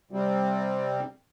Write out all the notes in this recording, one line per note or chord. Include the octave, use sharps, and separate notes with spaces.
C3 G3 C4